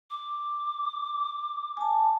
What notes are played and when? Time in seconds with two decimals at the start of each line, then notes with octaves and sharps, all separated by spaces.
0.10 D6
1.77 G#5 A5